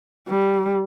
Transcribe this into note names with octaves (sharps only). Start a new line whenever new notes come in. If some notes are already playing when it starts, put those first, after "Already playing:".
G3